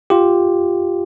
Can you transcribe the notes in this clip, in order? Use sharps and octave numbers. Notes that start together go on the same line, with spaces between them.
F4 G4